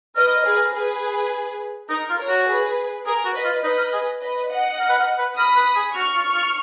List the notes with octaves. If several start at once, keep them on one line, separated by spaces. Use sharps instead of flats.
A#4 B4 D#5
G#4 B4
G#4 B4
D#4 A#4
F4
A#4 C#5
F#4
G#4 B4
G#4 A#4
F#4
B4 D#5
F4
D#4 B4 D#5
A#4
G#4
B4 D#5
D#5 F#5
A#4
B4
A#4
B4
A#4 B5 D#6
B4
G#4
F#4 C#6 F6
F4
F4